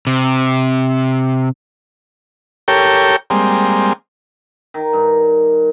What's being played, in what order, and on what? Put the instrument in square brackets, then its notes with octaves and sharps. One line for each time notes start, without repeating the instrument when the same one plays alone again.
[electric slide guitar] C3
[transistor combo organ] G4 A4 A#4 C#5 G5
G3 G#3 A#3 C4
[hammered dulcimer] D#3
G2